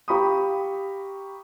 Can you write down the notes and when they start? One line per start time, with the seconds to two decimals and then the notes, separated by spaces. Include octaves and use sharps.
0.08 G4 F5 A#5 B5 C#6 D#6